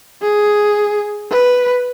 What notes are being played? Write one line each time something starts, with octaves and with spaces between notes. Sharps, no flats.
G#4
B4